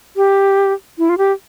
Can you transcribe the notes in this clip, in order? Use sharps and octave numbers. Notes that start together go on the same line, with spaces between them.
G4
E4
F4
G4